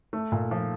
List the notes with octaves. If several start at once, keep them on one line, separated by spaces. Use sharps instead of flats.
A3
A#2
F3